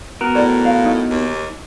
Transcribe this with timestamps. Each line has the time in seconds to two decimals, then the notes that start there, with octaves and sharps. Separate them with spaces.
0.21 B3 F#4 A#4
0.35 A2 D5
0.65 F5
0.85 D#4
1.10 D#2